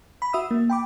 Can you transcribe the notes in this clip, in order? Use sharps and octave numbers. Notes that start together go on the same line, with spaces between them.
B5
F#4 E5 D#6 E6
A#3
G5 B5 D6